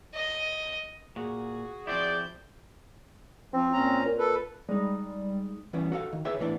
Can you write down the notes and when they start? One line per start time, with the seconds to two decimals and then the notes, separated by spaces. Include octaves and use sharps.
0.14 D#5
1.16 A#2 F#4 G#4
1.87 F3 C4 E4 D5 G6
3.53 F3 C4
3.73 A#2 C#4 A#5
4.05 A#2
4.18 A4 B4
4.69 G3 G#3 D#4
5.73 E3 G3 B3 C#4
5.92 F#4 A4 F5
6.13 D#3
6.25 G4 G#4 B4 C#5 E5
6.39 B1 A2 E3 B3 D4